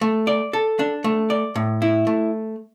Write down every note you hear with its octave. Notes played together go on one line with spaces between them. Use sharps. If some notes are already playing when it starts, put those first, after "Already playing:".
A3
D5
A4
D4
A3
D5
A2
E4
A3